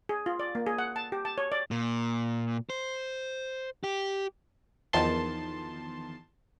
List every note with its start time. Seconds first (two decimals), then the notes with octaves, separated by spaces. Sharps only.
0.09 G#4
0.26 F4
0.40 D5
0.55 A#3
0.67 G#4
0.79 F#5
0.96 A5
1.12 G4
1.25 A5
1.38 C#5
1.52 D5
1.71 A#2
2.70 C5
3.84 G4
4.93 E2 D#3 F3 A5 C6